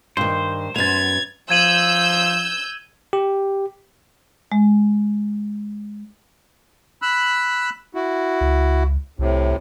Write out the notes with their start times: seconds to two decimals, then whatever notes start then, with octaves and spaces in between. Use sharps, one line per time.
0.17 G2 D#3 C5
0.76 F#2 B3 G#6 A6 F7
1.50 F3 E6 G6 G#6 D#7 F#7
3.13 G4
4.52 G#3
7.02 B5 E6 F#6
7.95 E4 F#4
8.41 C#2
9.19 C2 A2 C3